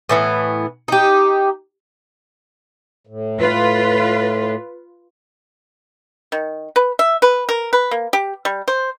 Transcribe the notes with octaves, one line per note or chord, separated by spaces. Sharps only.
A2 E3 B3
D#4 G4
A2
F4 B4
D#3
B4
E5
B4
A#4
B4
A#3
G4
G3
C5